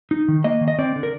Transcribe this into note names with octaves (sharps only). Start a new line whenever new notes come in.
D#4
D#3
A#3 D#5
D#3
D#5
C4 D5
D3
A#4